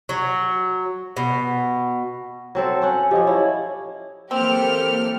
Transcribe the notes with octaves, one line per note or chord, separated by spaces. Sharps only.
F#3
B2
F#3 C4 A4
C#4 F#5
F3 G4 C#5 D#5
E4 C#5
E3 F#3 A#3 C4 G4 A4 F6